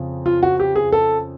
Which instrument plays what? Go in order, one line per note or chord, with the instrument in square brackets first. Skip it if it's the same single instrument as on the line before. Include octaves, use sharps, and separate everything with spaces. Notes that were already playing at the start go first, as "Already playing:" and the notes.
Already playing: [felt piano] F2 C#3
[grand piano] F4
F#4
G4
G#4
A4